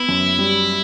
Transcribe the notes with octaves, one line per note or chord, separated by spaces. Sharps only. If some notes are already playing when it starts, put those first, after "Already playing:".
Already playing: B3 E4
F#2
G3